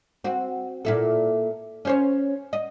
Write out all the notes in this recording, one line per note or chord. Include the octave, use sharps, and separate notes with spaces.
C4 F#4
A#2 E4 A4
C#4 C5 C#5
D#5